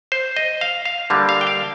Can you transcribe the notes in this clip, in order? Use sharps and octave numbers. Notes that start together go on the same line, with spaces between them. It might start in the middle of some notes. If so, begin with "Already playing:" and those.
C5
D#5
F5
F5
D3 G3 A#3 D4
F5
G5
F5